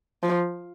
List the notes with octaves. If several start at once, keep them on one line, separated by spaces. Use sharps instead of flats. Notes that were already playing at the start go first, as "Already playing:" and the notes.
F3